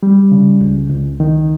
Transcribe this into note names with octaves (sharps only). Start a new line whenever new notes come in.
G3
C#3
C#2
C#2
D#3